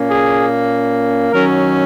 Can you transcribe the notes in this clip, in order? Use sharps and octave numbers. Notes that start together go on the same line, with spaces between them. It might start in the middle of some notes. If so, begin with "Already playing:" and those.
Already playing: A#2 A#3 C#4
G#4
D#3 F#3 C#4 A#4